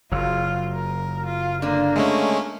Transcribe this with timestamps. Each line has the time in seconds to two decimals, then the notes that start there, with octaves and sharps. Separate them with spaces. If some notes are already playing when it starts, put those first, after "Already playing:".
0.12 F#1 F#3 F4
0.73 A#4
1.26 F4
1.62 D3 A#3 D4
1.96 G#3 A3 C#4